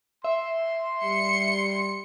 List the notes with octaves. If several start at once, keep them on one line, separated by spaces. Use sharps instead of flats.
E5 C6
G3 C#7